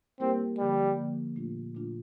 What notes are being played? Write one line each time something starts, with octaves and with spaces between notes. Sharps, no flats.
G3 A#3 C4 E4 G4 A#4
D3 F3 G3 A#3
D3 F3 A#3
A#2 A3 D4 F4
A#2 A3 D4 F4